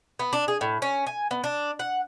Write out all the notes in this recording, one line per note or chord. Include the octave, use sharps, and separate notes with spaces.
B3
D4
G#4
A2
C#4
G#5
B3
D4
F#5